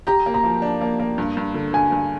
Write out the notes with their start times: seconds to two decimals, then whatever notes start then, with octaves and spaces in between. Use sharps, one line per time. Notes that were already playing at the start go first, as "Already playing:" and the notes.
0.07 G4 A#5
0.26 A#3
0.34 A#5
0.43 F3
0.62 D4
0.81 A#3
0.99 A#3
1.18 G2
1.37 G2
1.54 D3
1.73 G2 G#5
1.92 G2